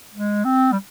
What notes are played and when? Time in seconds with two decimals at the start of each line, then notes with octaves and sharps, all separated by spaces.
0.14 G#3
0.44 C4
0.72 G3